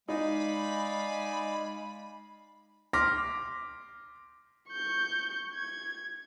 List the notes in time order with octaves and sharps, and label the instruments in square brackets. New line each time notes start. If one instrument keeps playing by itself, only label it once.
[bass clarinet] G#3 [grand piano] D#4 [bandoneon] D5 F5 G#5 [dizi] B5
[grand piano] C6 D6 F6 A#6 B6
[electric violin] C#6 G6
G#6